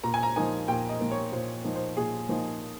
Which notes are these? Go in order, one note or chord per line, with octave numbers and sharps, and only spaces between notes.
A#2 A#5
G#5
A#5
F3 A#3 D#4 G#5
A#2 G5
D#5
F3 A#3 D#4
C#5
A#2 C5
F3 A#3 D#4
C5
A#2 G#4
F3 A#3 D#4